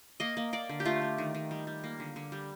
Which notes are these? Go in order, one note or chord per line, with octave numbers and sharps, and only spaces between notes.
A#3 D#5
A#3
A#3 D5
D3
G4
A3 F4
A3
D#3
D#3
G3
G3
A#3
D3
D3
G3